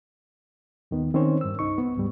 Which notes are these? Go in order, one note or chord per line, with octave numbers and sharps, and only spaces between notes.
D#2 D#3 B3
D#3 C4 C#4 D#4 C5 C#5
G2 E6
C2 D#4 C#6
B3
D2 G#2 G3